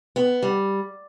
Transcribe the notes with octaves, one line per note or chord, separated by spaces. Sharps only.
B3
G3